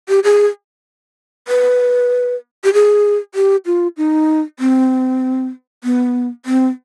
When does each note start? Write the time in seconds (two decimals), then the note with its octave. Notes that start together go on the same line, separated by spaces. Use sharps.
0.09 G4
0.24 G#4
1.48 B4
2.64 G4
2.73 G#4
3.35 G4
3.66 F4
3.97 D#4
4.59 C4
5.84 B3
6.46 C4